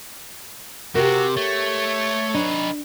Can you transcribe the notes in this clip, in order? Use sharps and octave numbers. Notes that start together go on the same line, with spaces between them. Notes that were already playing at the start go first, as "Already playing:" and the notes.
C3 F#4 G4 A#4
A3 C#5
D4 D#4 B4